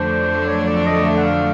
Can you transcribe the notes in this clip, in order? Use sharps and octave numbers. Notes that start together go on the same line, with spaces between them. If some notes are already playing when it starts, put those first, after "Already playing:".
Already playing: F2 D3 F#3 A3 D4 C5
C#5
D5
D#5
E5
F#5
F5